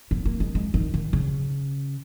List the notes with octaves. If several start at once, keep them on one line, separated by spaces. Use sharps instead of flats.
B3
A#3
G#3
G#3
D#3
D#3
C#3